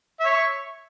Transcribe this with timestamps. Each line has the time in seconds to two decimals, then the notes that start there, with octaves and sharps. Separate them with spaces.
0.20 E5
0.25 C#5
0.29 C#6